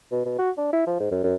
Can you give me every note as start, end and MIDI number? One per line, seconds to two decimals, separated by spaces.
0.11 0.21 47
0.26 0.37 47
0.38 0.50 66
0.58 0.71 62
0.73 0.82 64
0.87 0.96 53
1.00 1.07 44
1.11 1.24 42
1.24 1.35 42